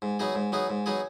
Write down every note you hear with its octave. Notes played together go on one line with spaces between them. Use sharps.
G#2
F#3 B3 D#4 G#4
G#2
F#3 B3 D#4 G#4
G#2
F#3 B3 D#4 G#4